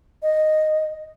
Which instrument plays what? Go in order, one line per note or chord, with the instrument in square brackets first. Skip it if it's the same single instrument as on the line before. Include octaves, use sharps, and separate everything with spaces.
[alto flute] D#5